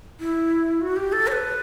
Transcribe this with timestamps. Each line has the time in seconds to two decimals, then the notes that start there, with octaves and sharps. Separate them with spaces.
0.20 E4
0.81 F#4
0.96 G4
1.12 A4
1.27 C#5
1.32 B4